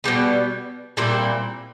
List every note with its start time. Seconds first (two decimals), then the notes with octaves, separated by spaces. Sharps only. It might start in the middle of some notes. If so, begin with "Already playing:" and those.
0.04 B2 G3 B3
0.97 A#2 G3 C4 E4